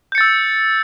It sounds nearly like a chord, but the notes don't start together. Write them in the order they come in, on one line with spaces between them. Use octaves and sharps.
G6 C#7 A6 E6